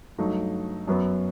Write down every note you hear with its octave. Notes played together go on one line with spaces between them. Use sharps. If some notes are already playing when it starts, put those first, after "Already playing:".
G2 F#3 A3 D#4
F#2 F#3 B3